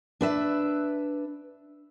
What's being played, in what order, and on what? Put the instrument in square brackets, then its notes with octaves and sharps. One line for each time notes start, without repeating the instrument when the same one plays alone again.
[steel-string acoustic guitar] D4 B4 E5